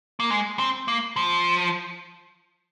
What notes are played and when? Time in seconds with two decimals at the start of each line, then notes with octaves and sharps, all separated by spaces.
0.20 A#3
0.30 G#3
0.59 C4
0.88 A#3
1.16 F3